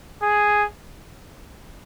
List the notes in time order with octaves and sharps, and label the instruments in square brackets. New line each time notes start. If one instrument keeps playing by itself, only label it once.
[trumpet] G#4